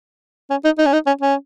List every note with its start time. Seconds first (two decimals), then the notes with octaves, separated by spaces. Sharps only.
0.50 C#4
0.65 D#4
0.79 D#4
0.86 C#4
0.93 D#4
1.07 C#4
1.21 C#4